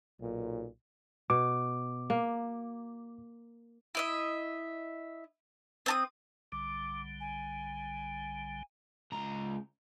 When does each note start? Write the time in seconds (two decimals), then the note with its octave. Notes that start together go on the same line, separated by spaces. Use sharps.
0.20 B1 A#2
1.30 B2 D6
2.10 A#3
3.95 E4 D#5 E5
5.86 C4 A5 D#6
6.52 B1 D3 G3 D6
7.20 G#5
9.12 C#2 A#5